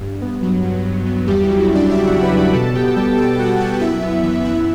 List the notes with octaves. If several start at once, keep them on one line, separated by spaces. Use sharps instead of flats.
G2
B3
F#3
G2
G2
B3
E2 G3 G4
E4
F#3
F#4
C#3
D4 D5
E2 E4 E5
F#4 F#5
E2
B4 B5
F#3
B4 B5
B2 A4 A5
B3 G4 G5
G3 A4 A5
B2 A4 A5
B2 F#4 F#5
B3 F#4 F#5
F#2 E4 E5
B3
E3
F#2 E4 E5